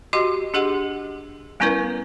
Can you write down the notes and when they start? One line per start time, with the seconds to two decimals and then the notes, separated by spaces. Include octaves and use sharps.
0.13 F#4 G4 D#5 C6
0.54 D4 G4 G#4 D#5 F#5 C6
1.60 G3 B3 C#4 E4 A#4 B4